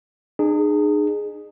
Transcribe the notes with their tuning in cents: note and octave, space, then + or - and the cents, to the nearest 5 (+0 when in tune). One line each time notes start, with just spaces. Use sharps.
D#4 -45 G#4 +0